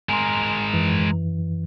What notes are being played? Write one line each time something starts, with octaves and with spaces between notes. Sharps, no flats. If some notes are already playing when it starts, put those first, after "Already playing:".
G#3 A#4 G#5 A#5 C6
F#2 E3